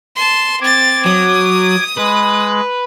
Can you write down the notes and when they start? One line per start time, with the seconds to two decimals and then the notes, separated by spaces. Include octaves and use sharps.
0.16 A5 C6
0.61 C4 D6 G#6 A6
1.05 F#3 D#6
1.97 G#3 B4